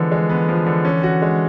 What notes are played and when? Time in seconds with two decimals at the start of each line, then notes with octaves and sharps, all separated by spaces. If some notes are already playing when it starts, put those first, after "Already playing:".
Already playing: D3 E3 F3 G#3 B3
0.12 G#3
0.29 B3
0.49 F3
0.66 D3
0.85 C#4
1.03 F#4
1.22 G#3